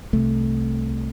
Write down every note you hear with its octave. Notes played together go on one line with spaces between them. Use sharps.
C2 C3 A3